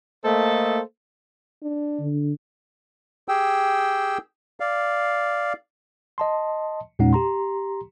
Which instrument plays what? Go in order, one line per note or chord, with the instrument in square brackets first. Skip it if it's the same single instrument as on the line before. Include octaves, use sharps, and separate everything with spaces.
[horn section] A3 A#3 A4 C5 D#5
[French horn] D4
[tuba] D3
[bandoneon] G4 G#4 G5 E6
D5 F5
[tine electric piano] D#5 A5 C6
E2 A#2 G#3 C#4 D#4 F#5
G4 A#5 C6